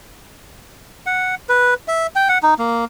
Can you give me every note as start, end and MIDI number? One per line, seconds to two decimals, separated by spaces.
1.06 1.35 78
1.49 1.74 71
1.88 2.07 76
2.16 2.28 79
2.29 2.38 78
2.43 2.54 63
2.59 2.85 58